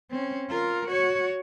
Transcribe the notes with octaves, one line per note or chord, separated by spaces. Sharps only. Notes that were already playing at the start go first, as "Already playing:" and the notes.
C4 C#4
F4 A#4
F#4 C#5